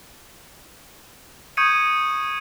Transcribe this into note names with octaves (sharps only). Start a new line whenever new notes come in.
C#6 D#6 G6 G#6 C#7 D#7